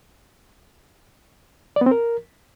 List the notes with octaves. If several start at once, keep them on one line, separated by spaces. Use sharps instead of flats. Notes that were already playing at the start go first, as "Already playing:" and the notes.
D5
B3
C4
A#4